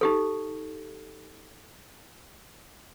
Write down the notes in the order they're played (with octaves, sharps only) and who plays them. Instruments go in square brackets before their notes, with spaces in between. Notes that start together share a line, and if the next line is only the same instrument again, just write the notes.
[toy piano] D#4 G4 A4